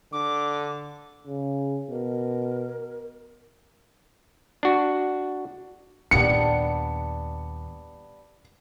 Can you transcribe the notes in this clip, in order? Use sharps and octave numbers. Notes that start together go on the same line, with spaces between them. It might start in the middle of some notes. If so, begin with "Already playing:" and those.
D3 D6
C#3
B2 A#4
D4 F#4
D#2 A#2 G3 B3 D4 C#7